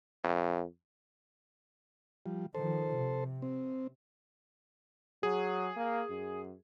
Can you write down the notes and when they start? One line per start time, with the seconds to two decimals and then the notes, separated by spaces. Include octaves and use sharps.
0.24 F2
2.26 F3 G3
2.55 D#3 F3 A4 C5
2.93 C3
3.42 C4
5.23 F#3 G#4
5.76 A#3
6.09 F#2